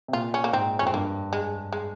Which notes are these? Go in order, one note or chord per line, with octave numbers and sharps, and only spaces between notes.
C3
A#2 F4
C#4
A#3
G#2 C4
F2 C#4
C4
G2 A#3
G#3
G#3